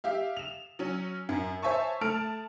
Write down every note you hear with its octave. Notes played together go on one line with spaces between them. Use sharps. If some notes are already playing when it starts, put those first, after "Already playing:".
G4 E5 F5
E7 F7
F#3 C#4
F#2
C5 C#5 E5 G#5 A5 C#6
A3 A5 F6 D7